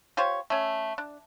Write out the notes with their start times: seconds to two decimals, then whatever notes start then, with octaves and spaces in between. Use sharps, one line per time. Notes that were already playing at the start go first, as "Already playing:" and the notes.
0.17 F4 G4 C5 C#5
0.50 A3 C#4
0.98 D4